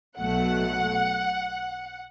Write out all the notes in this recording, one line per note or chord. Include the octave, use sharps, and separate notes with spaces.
B1 B2 F#3 A3 F#5